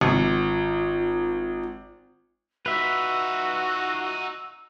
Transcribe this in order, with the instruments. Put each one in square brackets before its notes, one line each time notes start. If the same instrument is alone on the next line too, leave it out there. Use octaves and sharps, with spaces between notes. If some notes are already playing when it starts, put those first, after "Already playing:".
[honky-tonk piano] G#1 [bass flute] F4
[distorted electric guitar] D#4 F4 [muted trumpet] F#4 [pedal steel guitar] B4 E5 [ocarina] E6